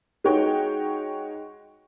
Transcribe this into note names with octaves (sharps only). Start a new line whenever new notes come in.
G#3 D#4 F#4 C#5 G5